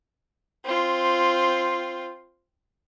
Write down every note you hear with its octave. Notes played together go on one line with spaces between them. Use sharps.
C4 F4